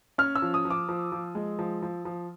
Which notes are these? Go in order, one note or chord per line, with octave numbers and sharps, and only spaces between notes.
C#4 F6
E6
F3
D#6
F3
D6
F3
F3
G#3
F3
F3
F3